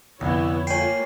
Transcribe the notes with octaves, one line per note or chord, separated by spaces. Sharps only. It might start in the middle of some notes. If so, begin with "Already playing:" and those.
C2 F2 D3 B3 E4 C#5
A3 A#3 F4 C#5 G5 G#5 C7